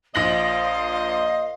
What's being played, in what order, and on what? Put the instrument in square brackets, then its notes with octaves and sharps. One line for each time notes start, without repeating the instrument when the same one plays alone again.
[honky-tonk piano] A#1 A#6 F#7 [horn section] A#2 C5 D#5 [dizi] F5